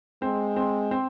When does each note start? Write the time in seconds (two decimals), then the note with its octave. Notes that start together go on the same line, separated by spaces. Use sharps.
0.22 G#3 C4
0.56 C4
0.91 C4